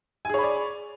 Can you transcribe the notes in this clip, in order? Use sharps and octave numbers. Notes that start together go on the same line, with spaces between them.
G#4 C#5 D5 G#5 B5